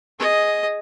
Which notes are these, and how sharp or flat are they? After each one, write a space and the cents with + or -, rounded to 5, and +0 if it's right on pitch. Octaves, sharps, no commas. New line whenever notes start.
G#4 +0 D#5 +0